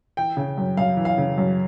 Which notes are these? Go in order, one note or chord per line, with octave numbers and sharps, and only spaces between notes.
E3 G5
C#3
F#2
F#2 F5
E3
F5
C#3
F#2